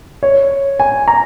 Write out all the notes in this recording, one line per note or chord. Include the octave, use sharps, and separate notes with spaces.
C#5
G#5
A#5